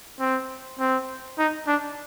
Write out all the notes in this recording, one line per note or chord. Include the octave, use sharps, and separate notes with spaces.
C4
C4
D#4
D4